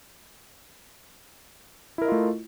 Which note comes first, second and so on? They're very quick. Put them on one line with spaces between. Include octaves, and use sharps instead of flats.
E4 A#4 D#5 F4 A3